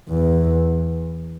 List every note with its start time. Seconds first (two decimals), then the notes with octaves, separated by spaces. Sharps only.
0.09 E2